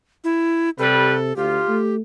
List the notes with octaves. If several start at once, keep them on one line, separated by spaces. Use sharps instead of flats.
E4
C3 G3 A4 B4
D2 F4 G4
A3